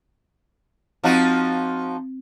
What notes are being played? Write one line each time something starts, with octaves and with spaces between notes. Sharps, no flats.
F3 C4 D#4 F#4